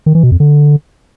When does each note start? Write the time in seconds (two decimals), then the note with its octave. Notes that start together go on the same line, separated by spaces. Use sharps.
0.06 D#3
0.15 E3
0.23 B2
0.32 F2
0.40 D3